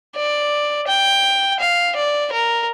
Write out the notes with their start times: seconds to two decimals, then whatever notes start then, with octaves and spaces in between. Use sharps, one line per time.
0.16 D5
0.87 G5
1.60 F5
1.96 D5
2.32 A#4